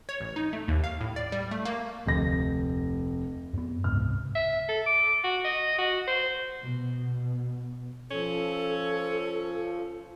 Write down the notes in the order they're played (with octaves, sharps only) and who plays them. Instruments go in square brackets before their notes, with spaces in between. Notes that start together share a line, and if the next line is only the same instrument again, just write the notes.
[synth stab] C#5
A1
D#4
A3
D#2
F5
A2
D5
G3
A3
A#3
[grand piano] F1 A#6 [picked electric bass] D2
[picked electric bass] F#2 B3
[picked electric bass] C#2 G#2 C3 [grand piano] F6
[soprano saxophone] E5
A4
D6
F#4
D#5
F#4
C5
[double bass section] B2
[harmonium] F3 [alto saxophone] C#4 [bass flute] A4